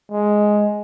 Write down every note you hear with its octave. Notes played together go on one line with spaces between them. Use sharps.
G#3